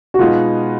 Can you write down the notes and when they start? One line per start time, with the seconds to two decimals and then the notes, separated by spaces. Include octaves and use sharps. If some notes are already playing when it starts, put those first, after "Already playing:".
0.14 F#4
0.19 B2 G#3 B3 D#4 F4